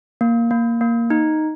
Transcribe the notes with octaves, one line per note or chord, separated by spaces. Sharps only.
A#3
A#3
A#3
D#4